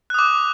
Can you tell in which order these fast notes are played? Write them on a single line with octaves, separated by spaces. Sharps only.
F#6 D#6 D6